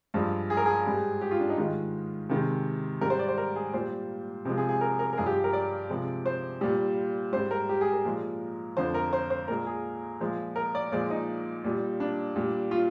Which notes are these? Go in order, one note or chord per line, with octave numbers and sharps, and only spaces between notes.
G2 F3 G#3
G#4
A#4
G#4
G#2 G3
G4
F4
D4
D#4
G#2 D#3 G#3 F4
C3 D#3 G#3
G#2 G3 A#4
C5
D5
C5
A#4
G#4
A#2 G3 C5
C3 F3 G#3
G#4
G#4
A#4
A#4
A#4
G2 F3 G#3 G#4
G4
A#4
D5
C3 F3 G#3
C5
A#2 G3
G#2 G3 C5
A#4
G4
G#4
A#4
A#2 F3 G#3
F2 D3 F3 C5
A#4
C5
C5
A#2 G#3 A#4
G#4
A#2 F3 G#3
A#4
D5
A#2 F3 G#3 D5
D#4
A#2 G3
D4
A#2 G3
F4